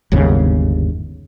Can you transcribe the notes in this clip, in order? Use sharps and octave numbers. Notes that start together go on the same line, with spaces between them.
G1 D#2 G#2 C#3